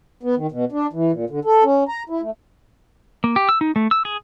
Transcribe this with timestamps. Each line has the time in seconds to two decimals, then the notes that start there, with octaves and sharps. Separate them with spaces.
0.23 B3
0.36 D#3
0.52 B2
0.72 D4
0.93 E3
1.12 A#2
1.30 D3
1.45 A4
1.64 C#4
1.88 A#5
2.09 E4
2.21 A3
3.24 A#3
3.36 G4
3.49 E6
3.61 D#4
3.76 A3
3.91 E6
4.05 G#4